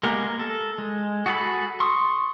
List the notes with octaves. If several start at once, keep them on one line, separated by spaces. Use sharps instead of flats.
G#3 A#3 B3 G4 A#4
A4
G#3
F#4 G#4 A4 C5 B5
C6 C#6 D#6 E6